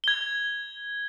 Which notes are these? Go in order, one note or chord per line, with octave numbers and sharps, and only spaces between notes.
G#6 G7